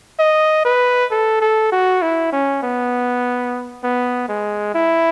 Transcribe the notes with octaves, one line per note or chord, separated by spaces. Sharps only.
D#5
B4
A4
A4
F#4
E4
C#4
B3
B3
G#3
E4